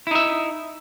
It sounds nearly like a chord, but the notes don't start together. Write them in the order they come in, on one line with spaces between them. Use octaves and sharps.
E4 D#4 E5